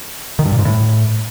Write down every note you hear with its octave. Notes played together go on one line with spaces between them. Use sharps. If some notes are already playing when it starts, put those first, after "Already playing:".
D#3
G2
A#2
G#2
A2